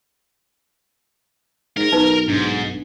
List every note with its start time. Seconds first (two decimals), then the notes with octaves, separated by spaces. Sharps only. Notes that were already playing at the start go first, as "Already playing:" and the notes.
1.77 G#2 A#4
1.92 B1 D#4 B4
2.28 G#2 D4